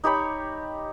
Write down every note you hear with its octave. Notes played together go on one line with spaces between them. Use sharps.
D#4 G4 C#5 B5